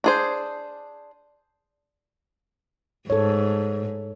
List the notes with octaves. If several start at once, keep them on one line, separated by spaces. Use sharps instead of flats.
D4 G#4 C5
G#2 A4 C#5